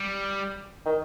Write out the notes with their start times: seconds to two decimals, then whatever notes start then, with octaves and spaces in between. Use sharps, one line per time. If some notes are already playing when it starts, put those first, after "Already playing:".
Already playing: G3
0.85 D#3